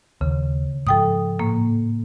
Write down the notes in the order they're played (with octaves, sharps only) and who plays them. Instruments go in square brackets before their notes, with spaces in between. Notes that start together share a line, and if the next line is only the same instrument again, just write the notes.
[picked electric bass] D#2 [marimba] C#3
[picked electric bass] G#2 F3 [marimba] A4 G5 D#6
[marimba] A2 A#3